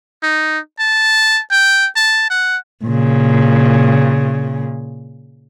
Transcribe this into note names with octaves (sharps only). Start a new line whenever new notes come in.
D#4
A5
G5
A5
F#5
A#2 C#3